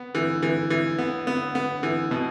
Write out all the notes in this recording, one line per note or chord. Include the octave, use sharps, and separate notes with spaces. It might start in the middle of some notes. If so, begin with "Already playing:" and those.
Already playing: B3
E3
E3
E3
B3
B3
B3
E3
B2